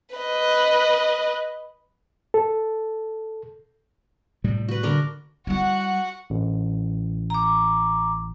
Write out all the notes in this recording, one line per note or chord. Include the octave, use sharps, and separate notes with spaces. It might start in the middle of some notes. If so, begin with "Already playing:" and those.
B4 D#5
A4
A2 C3 G3
F#4 B4
D3 D4 A#4
G3 E4 F#4 F#5
A1
A#5 D6